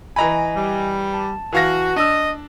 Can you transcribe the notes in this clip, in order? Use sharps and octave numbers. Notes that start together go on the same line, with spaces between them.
E3 D#5 G#5 A#5 B5
G3
A5
E3 F#4 F5 A#6
D4 D#5 E6